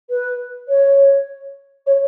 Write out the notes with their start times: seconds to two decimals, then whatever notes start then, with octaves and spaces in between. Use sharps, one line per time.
0.09 B4
0.68 C#5
1.86 C#5